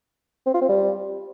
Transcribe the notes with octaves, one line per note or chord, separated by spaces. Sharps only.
C4
F4
C4
G3